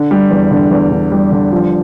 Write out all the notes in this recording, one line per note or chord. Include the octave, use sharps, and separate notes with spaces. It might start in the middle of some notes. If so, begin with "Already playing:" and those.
Already playing: D3
G3
E2
D3
E2
D3
G3
D3
F3